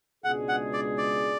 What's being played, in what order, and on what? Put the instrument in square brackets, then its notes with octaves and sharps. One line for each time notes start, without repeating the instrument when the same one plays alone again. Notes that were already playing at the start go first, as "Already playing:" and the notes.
[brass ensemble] C#2 B2 G#3 D4 G#4 [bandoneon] F#5
[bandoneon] F#5
D5
D5